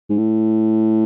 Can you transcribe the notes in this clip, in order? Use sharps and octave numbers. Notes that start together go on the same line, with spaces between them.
G#2
A2